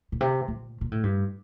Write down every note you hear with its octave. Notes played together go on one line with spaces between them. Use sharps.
A#2
C3
A#2
A#2
A2
G2